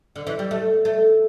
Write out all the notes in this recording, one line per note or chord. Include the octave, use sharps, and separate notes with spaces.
D3
E3
G3
A3
A3